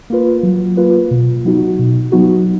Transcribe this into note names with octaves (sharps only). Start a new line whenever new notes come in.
A#3 F4 B4
F#3
A#3 F4 B4
B2
F#3 B3 D#4 F#4
B2
F#3 B3 D#4 F#4